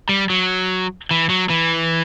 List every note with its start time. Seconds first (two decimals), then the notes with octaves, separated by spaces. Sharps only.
0.09 G3
0.30 F#3
1.11 E3
1.30 F#3
1.50 E3